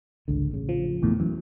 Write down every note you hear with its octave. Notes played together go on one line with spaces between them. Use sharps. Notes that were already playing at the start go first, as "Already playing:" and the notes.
G#1 C#2 D3
A1 C#3
F3
A#1 E2 A2
F#2 E3